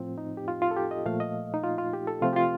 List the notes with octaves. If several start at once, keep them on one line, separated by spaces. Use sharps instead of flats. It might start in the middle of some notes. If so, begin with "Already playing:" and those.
Already playing: A2 F3 C4 F4
D#4
G4
F4
F4
A4
G4
D#5
A#2 F3 A3 F5
D#5
D#4
F4
F4
G4
A4
C3 F3 A3 C4 F4
G4
F4